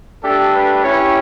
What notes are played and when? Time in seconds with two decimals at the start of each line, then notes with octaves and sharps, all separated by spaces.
0.22 A3 D4 G4 A4
0.53 B4
0.84 C#4 E4 G4 C#5